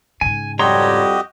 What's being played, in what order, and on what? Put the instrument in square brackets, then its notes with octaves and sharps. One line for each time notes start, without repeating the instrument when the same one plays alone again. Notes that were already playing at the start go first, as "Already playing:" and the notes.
[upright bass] G#2 C#3 [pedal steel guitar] G#5
[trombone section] F2 G3 [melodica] F#4 G4 D#5 [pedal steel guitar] C#5 A#5 C6